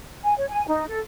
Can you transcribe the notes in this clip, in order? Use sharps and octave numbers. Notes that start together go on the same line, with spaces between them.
G#5
C#5
G#5
D#4
A4